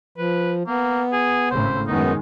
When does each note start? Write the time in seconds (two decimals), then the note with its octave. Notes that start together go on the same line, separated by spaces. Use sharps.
0.18 F3 B4
0.68 A#3 B3
1.13 G#4
1.51 G#1 A2 C#3 C5
1.88 F#2 D#3 G#3 B3 D#4